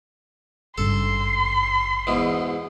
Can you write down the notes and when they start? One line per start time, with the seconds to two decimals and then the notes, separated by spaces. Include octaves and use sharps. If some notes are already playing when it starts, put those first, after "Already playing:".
0.78 G#1 G2 C#3 A4 C6
2.07 E2 G#2 B2